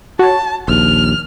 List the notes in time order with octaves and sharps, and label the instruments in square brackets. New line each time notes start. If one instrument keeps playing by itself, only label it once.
[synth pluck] F#4 C#5 [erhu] A5
[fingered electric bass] A#1 D#2 [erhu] F6